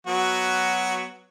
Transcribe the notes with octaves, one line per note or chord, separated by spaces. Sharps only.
F#3 B3 F#4